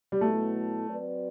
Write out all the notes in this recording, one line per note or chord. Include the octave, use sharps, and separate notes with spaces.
G3
B2 F#3 A3 B3 E4 A4
F#3 C4 F#4 B4 D5